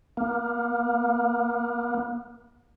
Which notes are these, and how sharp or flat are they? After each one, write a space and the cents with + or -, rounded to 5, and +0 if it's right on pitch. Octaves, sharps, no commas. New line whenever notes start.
A#3 +35